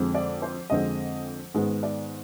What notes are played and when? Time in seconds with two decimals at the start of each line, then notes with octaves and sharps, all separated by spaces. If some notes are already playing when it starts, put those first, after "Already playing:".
Already playing: F2 D3 G#3 C4
0.15 D5
0.42 C5
0.70 F2 D3 G#3 C4 D#5
1.54 G#2 D#3 G#3 B3
1.83 D5